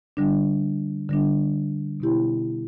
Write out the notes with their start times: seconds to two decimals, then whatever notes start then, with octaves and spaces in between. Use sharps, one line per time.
0.17 D3 G3 D4
1.09 D3 G3 D4
2.00 B2 B3 E4 G4